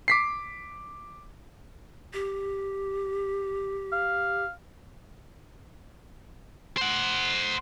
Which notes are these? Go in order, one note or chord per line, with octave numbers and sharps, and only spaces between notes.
D6 B6 C7
G4
F5
C5 F#5